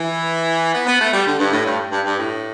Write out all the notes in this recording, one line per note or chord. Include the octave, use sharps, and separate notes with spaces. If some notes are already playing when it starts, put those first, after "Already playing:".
Already playing: E3
B3
B3
A3
G3
D3
G2
A2
G2
G2
G2
A2